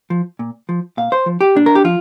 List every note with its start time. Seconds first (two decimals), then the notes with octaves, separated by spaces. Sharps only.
0.10 F3
0.39 A#2
0.69 F3
0.97 A#2 F5
1.12 C5
1.26 F3
1.41 G4
1.55 A#2 D4
1.66 A#4
1.75 G4
1.84 F3 F4